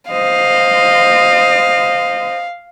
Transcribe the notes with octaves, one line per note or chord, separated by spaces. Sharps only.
C5 D#5 F5